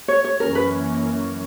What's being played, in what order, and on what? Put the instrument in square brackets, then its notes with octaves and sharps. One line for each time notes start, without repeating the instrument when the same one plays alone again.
[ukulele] C#5
C#5
[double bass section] F#2 E3 A#3 C#4 [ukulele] A#4
[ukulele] B4